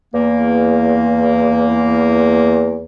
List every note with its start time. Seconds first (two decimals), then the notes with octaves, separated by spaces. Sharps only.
0.13 E2 A#3